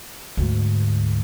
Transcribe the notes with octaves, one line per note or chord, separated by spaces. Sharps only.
D2 G#2